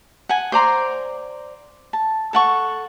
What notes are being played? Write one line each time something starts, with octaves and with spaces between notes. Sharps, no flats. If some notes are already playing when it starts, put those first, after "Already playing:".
F#5 G#5
C5 D5 A#5 C6
A5
A4 F#5 C#6